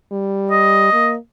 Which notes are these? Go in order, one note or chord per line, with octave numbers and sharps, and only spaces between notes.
G3
D#5
A#3